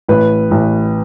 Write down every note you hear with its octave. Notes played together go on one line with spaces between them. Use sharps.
A1 B4
A1